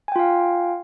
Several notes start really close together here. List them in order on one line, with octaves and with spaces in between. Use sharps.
G#5 G5 F4 F5